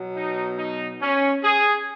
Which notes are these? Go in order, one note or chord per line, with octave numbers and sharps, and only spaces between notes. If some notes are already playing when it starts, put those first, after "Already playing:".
Already playing: B2 F#3
D#4
D#4
C#4
G#4